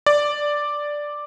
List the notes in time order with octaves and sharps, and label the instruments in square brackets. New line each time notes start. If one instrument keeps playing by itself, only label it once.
[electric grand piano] D5